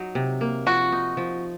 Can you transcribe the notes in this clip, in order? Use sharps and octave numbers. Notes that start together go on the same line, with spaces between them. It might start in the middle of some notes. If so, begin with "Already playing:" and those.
Already playing: F#3 D#4
C3
A#3
F3 F#4
D#4
F3